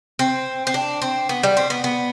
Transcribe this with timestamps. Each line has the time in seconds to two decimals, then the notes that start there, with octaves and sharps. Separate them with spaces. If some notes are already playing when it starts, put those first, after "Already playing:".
0.19 C4
0.67 C4
0.74 D4
1.02 C4
1.29 B3
1.43 G3
1.57 C4
1.70 B3
1.84 B3